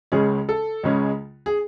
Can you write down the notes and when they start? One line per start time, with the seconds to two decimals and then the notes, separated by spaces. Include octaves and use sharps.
0.12 C#2 C#3 G#3 C#4 G#4
0.49 A4
0.83 C#2 C#3 G#3 C#4
1.46 G#4